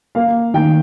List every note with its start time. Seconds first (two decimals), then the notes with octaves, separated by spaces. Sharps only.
0.15 A#3 F5
0.54 D#3 G5